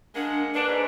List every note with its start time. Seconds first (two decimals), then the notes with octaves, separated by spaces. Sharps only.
0.15 G#3 A#3 D4 F#5
0.54 D4 B4
0.68 G#2